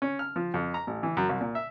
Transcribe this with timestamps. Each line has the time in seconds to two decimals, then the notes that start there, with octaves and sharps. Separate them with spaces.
0.02 C#4
0.19 F6
0.36 F3
0.54 F2
0.74 A#5
0.87 A1
1.03 E3
1.17 F#2
1.29 C2
1.41 A#2
1.55 E5